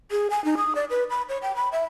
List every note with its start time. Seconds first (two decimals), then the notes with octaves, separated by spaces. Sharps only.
0.11 G#4
0.30 G#5
0.45 D#4
0.57 D#6
0.75 D5
0.90 B4
1.10 B5
1.29 C#5
1.42 G5
1.56 B5
1.72 E5